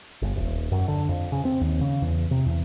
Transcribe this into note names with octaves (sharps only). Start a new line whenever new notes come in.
G1
D#1
F#2
D3
F2
C#3
C4
D#2
C#3
E2
C3
E2